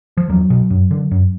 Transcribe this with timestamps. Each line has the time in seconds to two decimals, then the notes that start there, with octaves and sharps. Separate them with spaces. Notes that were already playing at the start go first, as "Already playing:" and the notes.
0.17 F3
0.29 E2 F#3
0.50 B2
0.70 F#2
0.91 D3
1.11 F#2